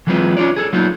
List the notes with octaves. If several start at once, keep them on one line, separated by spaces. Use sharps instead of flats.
E3 F#3 G#3 C4 F4 B4
C#4 D4 F4 C#5 D5
G#4 A4
F#3 A#3 B3 D4 D#4 F4